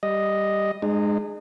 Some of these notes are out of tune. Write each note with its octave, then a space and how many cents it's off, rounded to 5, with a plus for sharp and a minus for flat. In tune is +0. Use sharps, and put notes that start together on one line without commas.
G3 +0 D#5 +0
G#3 +0 D#4 -40